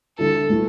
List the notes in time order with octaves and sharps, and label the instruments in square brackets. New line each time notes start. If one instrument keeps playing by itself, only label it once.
[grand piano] D3 G3 E4 [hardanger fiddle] A4
[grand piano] B2 A3 E4